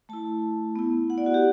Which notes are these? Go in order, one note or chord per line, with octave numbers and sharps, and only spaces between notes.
A3 E4 A5
B3 E4
F#5
D5
F#4
G4